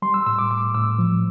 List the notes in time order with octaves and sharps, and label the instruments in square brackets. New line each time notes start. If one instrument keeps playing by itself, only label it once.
[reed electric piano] G3 C6
E6
A2 E6
D6
A2 D6
A2 E6
F3